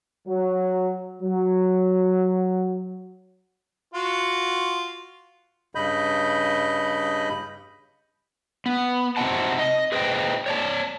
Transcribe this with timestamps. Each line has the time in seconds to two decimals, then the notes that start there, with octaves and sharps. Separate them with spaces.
0.28 F#3
1.23 F#3
3.94 F4 F#4
5.75 G2 C#3 D#5 B5 G6
8.66 B3
9.17 C3 C4 D#4 F#4 F#5 A5
9.59 D#5
9.92 G#4 B4 C5 D#5 F5 G5
10.46 C#5 D5 A5